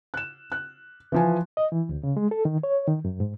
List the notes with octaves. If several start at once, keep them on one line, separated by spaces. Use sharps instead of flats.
F#6 E7
F#6
E3 F3 G#5
D#5
E3
D2
C#3
G#3
A4
D#3
C#5
D#3
F#2
G#2